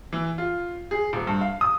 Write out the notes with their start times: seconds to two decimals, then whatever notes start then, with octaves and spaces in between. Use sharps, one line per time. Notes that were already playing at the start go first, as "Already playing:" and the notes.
0.13 E3
0.38 F4
0.91 G#4
1.13 D#1
1.27 G2
1.41 F5
1.61 D#6